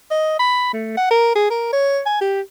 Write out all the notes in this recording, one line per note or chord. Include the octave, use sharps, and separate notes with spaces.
D#5
B5
A3
F#5
A#4
G#4
A#4
C#5
G#5
G4